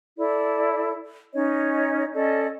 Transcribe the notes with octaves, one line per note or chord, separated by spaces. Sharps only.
E4 A4 D5
C#4 D#4 C#5 D#5
C#4 A4 D5 D#5